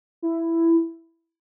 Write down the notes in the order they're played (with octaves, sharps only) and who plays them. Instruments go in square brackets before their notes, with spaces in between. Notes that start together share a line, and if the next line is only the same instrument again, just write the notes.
[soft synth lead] E4